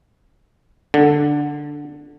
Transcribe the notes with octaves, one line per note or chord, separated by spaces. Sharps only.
D3